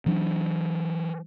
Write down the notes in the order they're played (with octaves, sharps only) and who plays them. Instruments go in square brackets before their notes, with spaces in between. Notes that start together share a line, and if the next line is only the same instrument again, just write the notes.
[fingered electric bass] E3 F#3 D4